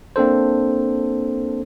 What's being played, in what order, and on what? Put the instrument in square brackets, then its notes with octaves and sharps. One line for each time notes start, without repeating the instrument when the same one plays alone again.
[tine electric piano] A#3 C4 D4 A4 C5